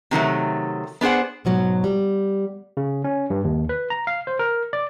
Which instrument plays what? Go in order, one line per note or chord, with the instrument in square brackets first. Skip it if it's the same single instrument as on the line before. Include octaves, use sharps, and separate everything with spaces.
[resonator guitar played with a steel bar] C3 D#3 F#3 A3
B3 D4 G#4 C5 F#5
[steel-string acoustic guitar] G#2 B2 F#3
G3
[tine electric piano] C#3
C#4
G2
D#2
B4
A#5
F5
C5
A#4
D5